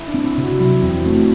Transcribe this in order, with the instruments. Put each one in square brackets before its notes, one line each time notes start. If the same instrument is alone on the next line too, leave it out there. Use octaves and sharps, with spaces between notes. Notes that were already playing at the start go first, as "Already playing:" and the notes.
Already playing: [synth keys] E4
D4
[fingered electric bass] C4
[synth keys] E4
[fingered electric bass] C3
[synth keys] F#4
[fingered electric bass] F#3 [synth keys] E4
[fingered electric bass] E2 [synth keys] C4
[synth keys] A3 [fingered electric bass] C4